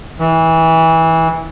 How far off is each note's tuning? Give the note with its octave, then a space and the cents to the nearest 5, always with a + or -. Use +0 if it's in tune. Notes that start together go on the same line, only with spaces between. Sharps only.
E3 -20